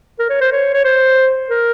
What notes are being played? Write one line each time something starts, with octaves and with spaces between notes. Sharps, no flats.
A#4
C#5
C5
C#5
C#5
C5
A#4